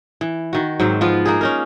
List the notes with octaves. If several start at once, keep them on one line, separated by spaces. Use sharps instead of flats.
E3
D#3 F#4
G#2 F#3 C4 C5
F3 B3 F4
A#3 D#4 G#4
C#4 D#4 A#4